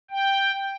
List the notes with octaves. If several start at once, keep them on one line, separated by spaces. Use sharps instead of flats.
G5